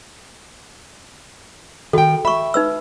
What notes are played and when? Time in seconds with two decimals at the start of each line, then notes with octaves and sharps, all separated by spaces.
1.93 D#3 F#4 A4 G5
2.25 E5 B5 C#6
2.54 D#4 B4 E6